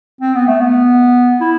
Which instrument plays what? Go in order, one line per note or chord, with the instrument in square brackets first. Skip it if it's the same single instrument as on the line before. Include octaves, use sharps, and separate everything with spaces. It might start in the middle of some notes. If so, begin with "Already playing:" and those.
[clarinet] C4
B3
A3
B3
E4